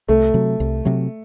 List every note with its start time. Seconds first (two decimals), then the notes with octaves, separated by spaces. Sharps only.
0.08 C2 A3
0.34 C3 F#3
0.60 C2
0.85 C3 F#3